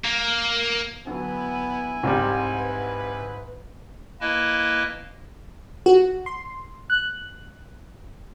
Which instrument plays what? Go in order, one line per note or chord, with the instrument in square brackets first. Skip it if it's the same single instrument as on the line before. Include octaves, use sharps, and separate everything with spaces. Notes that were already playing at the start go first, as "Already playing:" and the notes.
[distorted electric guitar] A#3
[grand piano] D3 F#3 [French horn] B3 [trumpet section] E4 G#5
[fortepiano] C2 C3 G3 [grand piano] G#2
[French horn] B4
[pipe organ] A#3 E4 B4 D#5 G#5 A5
[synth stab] F#4
C6
F#6